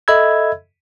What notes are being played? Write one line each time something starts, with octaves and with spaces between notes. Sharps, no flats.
A4 D#5 E5 B5 E6 G#6